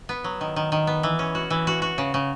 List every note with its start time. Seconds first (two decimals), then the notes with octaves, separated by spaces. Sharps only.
0.09 B3
0.24 F#3
0.41 D#3
0.56 D#3
0.72 D#3
0.87 B3
1.03 E3
1.19 C#4
1.35 F#4
1.50 E3
1.67 F#4
1.82 F#4
1.98 C#3
2.14 C#3